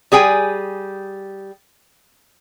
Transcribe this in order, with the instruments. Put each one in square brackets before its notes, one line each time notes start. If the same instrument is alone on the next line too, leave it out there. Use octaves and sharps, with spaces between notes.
[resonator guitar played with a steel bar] G3 G#4 G5 G#5